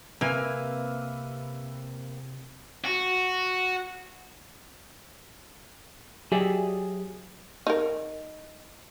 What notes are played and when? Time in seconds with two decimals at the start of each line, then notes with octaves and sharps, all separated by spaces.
0.21 C3 A#3 C4 B4 E5 G#5 F7
2.84 F#4
6.32 F#3 G4 G#4 D5 E5 G#5
7.67 D#4 A#4